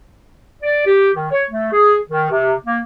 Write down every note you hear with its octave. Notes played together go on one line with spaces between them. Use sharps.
D5
G4
D#3
C#5
A3
G#4
D#3
C3
A#3